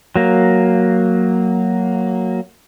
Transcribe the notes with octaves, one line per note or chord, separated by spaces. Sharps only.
F#3 A#3